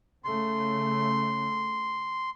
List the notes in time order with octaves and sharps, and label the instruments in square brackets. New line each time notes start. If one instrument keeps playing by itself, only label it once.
[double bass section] C#3 A3 [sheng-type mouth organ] C6